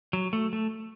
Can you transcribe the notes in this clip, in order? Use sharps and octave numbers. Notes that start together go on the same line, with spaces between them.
F#3
A3
A3